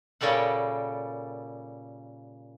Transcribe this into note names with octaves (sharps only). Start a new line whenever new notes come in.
A#2 C#3 G3 A4 F#5